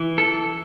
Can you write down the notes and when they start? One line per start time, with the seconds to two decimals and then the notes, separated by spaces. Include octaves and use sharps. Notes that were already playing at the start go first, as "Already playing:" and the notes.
Already playing: E3
0.18 A4